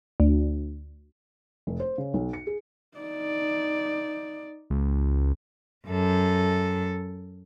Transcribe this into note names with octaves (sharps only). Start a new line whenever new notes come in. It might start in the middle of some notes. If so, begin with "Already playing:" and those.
D2
F1
C5
C#3
B1
C#7
G#4
D#4 D5
C#2
F#2 A4